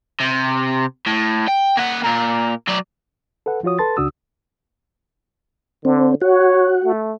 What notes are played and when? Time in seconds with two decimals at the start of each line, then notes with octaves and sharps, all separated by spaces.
0.20 C3
1.06 A2
1.48 G5
1.77 A#3 F#5
2.04 A#2 A#4
2.68 F#3 D5
3.46 A4 B4 F#5
3.63 F3 F4 F#4 C#5 D#6
3.79 A4 B4 A5 C6 A6
3.97 C#2 C#3 D4 F#4 D#6 E6
5.85 D3 C4
6.22 F#4 C#5
6.84 A3